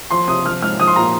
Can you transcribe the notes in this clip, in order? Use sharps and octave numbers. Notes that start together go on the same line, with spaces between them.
F3 C6
C3 D#6
F3 F6
G#2 F6
F3 D#6
C6
A#2 A#5